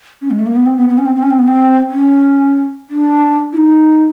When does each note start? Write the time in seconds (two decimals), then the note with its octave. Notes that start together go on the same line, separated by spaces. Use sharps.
0.22 C#4
0.31 G#3
0.39 A3
0.46 A#3
0.56 B3
0.66 C4
0.77 B3
0.89 B3
0.98 C#4
1.06 C4
1.16 C4
1.23 C#4
1.30 C4
1.39 B3
1.47 C4
1.90 C#4
2.90 D4
3.53 E4
3.57 D#4